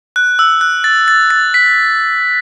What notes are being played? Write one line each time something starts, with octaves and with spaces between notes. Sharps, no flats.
F#6
E6
F#6
A6
A6
A6
B6